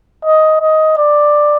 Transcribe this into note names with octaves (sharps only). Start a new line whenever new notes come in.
D#5
D#5
D5